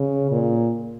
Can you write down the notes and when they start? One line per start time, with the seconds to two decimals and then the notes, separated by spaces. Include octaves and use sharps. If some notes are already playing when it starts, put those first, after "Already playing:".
Already playing: C#3
0.31 A#2